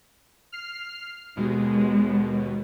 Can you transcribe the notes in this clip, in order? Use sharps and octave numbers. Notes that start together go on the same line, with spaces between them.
F6 C7
D#2 B2 G#3